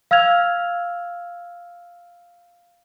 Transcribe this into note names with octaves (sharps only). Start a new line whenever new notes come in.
F5 E6 F6 G#6 F7